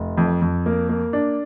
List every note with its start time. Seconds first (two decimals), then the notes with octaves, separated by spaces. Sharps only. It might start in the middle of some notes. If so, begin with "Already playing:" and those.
Already playing: F1
0.18 F2
0.42 F2
0.66 A#3
0.89 A#3
1.13 D4